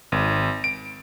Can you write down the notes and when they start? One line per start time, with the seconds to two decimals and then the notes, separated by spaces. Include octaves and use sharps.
0.12 G#1
0.64 D7